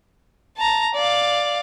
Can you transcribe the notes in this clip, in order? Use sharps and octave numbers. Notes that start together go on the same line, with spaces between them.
A5 A#5
D5 F5